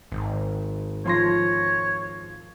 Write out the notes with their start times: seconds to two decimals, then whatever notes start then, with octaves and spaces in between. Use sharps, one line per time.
0.12 G#1
1.05 F3 C#5 C6 A#6